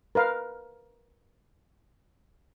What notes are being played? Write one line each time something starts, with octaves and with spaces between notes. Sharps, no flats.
A#4 B4 F5